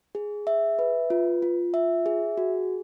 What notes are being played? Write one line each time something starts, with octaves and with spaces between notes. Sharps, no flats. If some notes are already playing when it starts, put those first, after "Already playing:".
G#4
E5
B4
F4
F4
E5
G#4
F#4